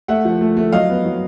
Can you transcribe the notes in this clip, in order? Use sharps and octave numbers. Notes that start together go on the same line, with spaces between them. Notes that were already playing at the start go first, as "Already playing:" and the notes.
A3 E5 F#5
F3
A3
A3
F#3 D#5 F5
B3
F#3